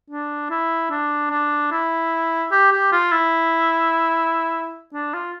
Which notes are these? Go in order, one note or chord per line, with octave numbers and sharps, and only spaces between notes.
D4
E4
D4
D4
E4
G4
G4
F4
E4
D4
F4